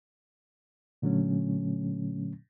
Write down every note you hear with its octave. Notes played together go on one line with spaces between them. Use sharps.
A#2 D3 F#3 A3 C#4